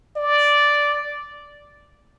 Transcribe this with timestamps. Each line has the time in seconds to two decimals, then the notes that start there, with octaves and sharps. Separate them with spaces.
0.16 D5